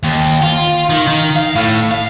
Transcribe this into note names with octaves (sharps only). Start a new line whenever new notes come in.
D#2
F4
D#3
D#3
F5
A2
F5